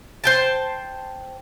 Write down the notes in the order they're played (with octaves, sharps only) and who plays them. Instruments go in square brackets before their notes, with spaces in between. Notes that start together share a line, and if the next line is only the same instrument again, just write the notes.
[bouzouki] C5 G5 A5